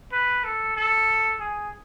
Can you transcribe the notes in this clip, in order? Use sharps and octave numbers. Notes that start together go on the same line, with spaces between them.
B4
A4
A4
G#4